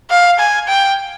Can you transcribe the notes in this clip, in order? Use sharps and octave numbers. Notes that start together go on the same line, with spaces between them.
F5
G#5
G5